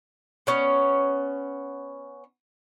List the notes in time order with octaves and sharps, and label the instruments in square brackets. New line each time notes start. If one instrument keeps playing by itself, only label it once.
[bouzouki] B3 C#4